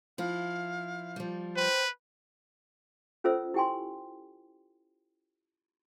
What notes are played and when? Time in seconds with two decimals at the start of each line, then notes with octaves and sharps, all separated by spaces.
0.18 F3 E4 F5
1.16 F3 G3
1.56 B4 C5 G5
3.24 C#4 F4 A4 C5 E5 E6
3.54 E4 G4 G5 G#5 C6